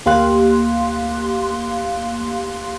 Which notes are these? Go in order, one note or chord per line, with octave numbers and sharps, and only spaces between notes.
D2 A#3 G4 F5 C6 F#6